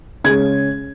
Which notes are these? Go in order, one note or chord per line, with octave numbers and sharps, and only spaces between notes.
C#3 G#3 C#4 G#6